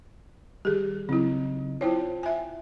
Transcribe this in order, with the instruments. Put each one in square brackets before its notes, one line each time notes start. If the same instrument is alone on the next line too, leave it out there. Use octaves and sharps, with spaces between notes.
[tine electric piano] D#3 G3 [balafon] G4 G#4
[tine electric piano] C#3 F#3 D#4 [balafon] C4 E4
[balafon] E4 C5 C#5 [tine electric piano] F4 G5 A5
[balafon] E5 G#5